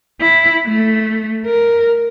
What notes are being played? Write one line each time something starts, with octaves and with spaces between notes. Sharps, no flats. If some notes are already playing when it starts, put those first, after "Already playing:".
E4
A3
A#4